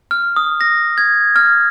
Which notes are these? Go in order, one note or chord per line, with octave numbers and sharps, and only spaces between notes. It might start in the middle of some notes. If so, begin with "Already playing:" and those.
F6
D#6
A#6
G#6
F6